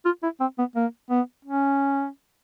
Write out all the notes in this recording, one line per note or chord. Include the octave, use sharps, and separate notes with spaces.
F4
E4
C4
B3
A#3
B3
C#4